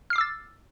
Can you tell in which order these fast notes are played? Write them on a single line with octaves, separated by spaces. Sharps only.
F6 C7 D6 E6 A6